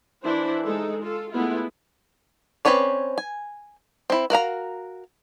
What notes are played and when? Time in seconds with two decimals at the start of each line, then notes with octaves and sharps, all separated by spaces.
0.23 E3 D4 E4 C5
0.65 G#3 D#4 A4
1.02 F4 A4
1.32 G#3 A3 B3 E4 F4
2.65 C4 C#4 B4 C#5 D5
3.18 G#5
4.10 C4 E4
4.30 F#4 A#4 F5 A#5